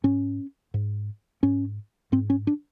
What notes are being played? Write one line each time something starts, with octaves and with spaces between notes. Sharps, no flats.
G#2 C#4
G#2
G#2 C#4
G#2 C4
C#4
D4